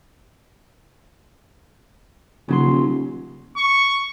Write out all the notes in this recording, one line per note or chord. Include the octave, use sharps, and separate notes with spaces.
D#1 C#3 F#3 C6
C#6